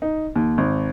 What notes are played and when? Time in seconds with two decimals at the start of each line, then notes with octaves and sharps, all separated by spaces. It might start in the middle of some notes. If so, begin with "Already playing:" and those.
0.02 D#4
0.36 D#2
0.58 G#1